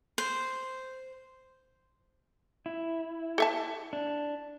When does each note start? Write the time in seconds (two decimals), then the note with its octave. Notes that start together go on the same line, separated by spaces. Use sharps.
0.18 C5
2.66 E4
3.38 A4 E5 A5
3.93 D4